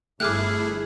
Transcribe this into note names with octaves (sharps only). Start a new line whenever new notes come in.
G1 A3 E4 G#4 D6 F6 F#6